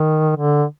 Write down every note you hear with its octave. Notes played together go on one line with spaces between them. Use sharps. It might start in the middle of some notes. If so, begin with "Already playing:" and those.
Already playing: D#3
D3